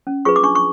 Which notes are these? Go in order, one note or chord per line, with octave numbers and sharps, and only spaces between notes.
C#4
F4 G#4 B4 C#6
D6
D4 C#6
C#6